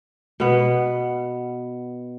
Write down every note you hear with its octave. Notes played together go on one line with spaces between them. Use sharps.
B2 B3